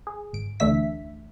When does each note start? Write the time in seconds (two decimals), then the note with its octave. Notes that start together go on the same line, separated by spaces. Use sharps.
0.07 G#4
0.33 G#1 D7
0.60 D2 E3 A3 D4 E5 B6